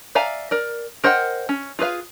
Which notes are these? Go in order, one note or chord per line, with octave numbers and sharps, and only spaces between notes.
D5 E5 F5 G#5 A#5
A#4 D5
A#4 C5 D#5 F#5 G5
C#4
F4 G#4 B4 F5